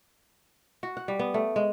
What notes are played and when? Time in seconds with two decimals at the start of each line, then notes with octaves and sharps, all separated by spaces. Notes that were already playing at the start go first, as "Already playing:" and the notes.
0.83 F#4
0.97 F#5
1.08 G3
1.19 B3
1.34 A3
1.56 G#3